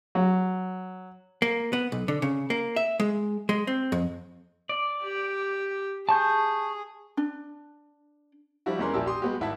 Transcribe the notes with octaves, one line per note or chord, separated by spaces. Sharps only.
F#3
A#3
B3
B1
D3
C#3
A#3
E5
G#3
G#3
C4
F2
D5
G4
G#4 A5 C#6 G6
D4
F3 G3 D4 E4 F#4
E2 G#3 C#4 A#4 C6
A#1 E4 G4 D5 A5 E6
G4 C6 D#6
G3 G#3 B3 F#4 G4
G#1 E4 F#5 A5 B6